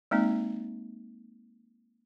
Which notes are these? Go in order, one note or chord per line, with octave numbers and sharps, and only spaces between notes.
G#3 A#3 C4 D#4